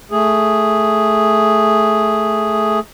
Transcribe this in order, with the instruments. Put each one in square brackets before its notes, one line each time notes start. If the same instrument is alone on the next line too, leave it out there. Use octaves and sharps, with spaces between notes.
[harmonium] A3 G#4